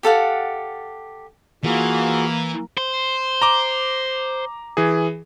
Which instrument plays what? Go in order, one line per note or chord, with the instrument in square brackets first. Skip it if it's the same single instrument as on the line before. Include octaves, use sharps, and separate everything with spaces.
[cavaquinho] G4 A4 F5 F#5
[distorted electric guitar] E3 [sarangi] A#3 [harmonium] F4 F#4 G#4
[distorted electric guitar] C5
[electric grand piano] A#5 D6
E3 G#4